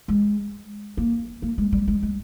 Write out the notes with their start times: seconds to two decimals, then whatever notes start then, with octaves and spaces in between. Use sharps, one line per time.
0.08 G#3
0.97 A#3
1.42 A#3
1.58 G#3
1.72 G3
1.87 G#3
2.03 G#3